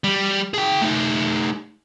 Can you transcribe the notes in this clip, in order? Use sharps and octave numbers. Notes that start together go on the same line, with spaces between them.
G3
G#4 G5
A3 D#4